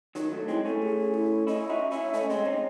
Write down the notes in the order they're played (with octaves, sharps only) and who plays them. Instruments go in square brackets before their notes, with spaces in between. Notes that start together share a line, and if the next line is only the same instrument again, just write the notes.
[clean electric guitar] D#3 F#3 [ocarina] D#4
[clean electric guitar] F#3 A3
[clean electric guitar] G#3 C4 [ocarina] E4
[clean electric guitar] A3 C#4 [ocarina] E4
[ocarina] G#4
E4
[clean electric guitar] C#4 E4 [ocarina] D#5
[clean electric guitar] D#4 F#4 [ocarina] E5
[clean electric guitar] C#4 E4 [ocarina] E5
[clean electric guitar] A3 C#4 [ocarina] D#5
[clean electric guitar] G#3 C4 [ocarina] D#5
[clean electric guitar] C4 D#4 [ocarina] C#5